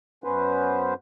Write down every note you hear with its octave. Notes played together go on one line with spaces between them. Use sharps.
F#2 B3 C#4 B4 C5